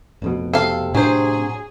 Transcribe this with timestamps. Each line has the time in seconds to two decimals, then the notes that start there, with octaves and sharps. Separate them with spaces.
0.22 F1 F2 B2
0.54 C3 A4 F5
0.95 A2 F#3 D4 G#4 C5